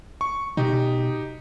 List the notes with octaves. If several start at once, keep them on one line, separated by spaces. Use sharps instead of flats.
C#6
B2 D#4 G4